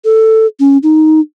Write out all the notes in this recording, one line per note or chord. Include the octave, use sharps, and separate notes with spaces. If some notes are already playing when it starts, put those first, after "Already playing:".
A4
C#4
D#4